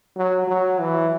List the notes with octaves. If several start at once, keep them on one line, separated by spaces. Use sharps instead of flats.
F#3
F#3
E3